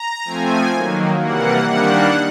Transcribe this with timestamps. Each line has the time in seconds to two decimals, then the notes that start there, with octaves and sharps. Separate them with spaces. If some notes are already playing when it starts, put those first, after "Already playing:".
Already playing: A#5
0.24 F3 A3 C4 G#5
0.72 D#3 F#3 A#3
1.20 C3 E3 G3 A#3 F#5
1.68 D#3 G3 A#3 D4 F#5